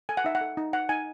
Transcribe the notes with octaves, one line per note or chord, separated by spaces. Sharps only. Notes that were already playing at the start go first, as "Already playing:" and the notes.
A4 G#5
F#5
D#4 E5
F#5
A4
D#4
D#4 F#5
D#4 G#5